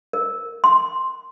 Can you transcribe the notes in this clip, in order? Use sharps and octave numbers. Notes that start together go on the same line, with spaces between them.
A#4
C6